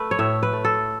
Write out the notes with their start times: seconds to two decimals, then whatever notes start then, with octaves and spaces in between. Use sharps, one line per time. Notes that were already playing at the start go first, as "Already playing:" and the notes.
Already playing: A3 B4
0.11 C#5
0.19 A2 E5
0.43 B4
0.53 A3
0.65 A4